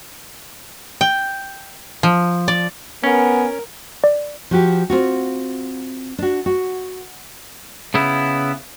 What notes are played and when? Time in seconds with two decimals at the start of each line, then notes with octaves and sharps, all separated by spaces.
1.01 G5
2.03 F3
2.48 D5
3.04 B3 C#4 A#4 G#5
4.04 D5
4.51 F3 F#4 G4
4.90 C4 F4 F#4
6.18 D4 F#4
6.46 F#4
7.94 C#3 B3 E4